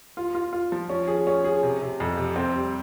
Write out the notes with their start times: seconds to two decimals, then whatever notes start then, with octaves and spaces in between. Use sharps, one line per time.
0.17 F4
0.35 F4
0.53 F4
0.72 F3
0.89 C#4
1.07 G#4
1.27 C#4
1.44 G#4
1.63 C3
1.82 C3
2.00 F2
2.17 C3
2.36 C4
2.55 G3